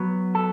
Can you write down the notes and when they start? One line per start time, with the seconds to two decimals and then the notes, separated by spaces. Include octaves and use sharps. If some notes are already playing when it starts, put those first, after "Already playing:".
Already playing: F#3 B3
0.35 A4